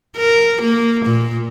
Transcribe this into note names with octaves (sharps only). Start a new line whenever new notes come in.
A#4
A#3
A#2